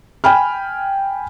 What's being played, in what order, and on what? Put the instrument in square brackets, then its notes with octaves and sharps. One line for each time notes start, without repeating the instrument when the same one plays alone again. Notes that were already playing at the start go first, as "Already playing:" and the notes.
[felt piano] G5 G#5 B5 F6